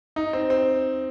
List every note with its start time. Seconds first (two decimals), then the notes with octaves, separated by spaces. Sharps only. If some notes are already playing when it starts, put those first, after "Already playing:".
0.16 D#4
0.33 C4
0.50 C4